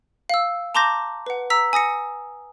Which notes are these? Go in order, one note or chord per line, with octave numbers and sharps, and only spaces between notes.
F5 E6
A5 A#5 C6 D6 G6 A#6
B4 F#5
A#5 E6 B6
G#5 D#6 A#6 C#7